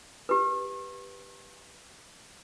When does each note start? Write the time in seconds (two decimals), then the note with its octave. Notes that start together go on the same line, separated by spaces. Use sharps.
0.29 G4 B4